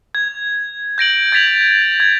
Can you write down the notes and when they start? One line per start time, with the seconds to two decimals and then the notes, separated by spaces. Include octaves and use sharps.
0.15 G#6
0.98 G6 A#6 D7 F#7
1.32 G#6 A6 B6 F7 F#7
2.00 G#6